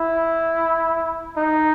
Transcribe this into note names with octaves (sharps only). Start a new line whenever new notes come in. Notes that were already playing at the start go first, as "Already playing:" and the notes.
Already playing: E4
D#4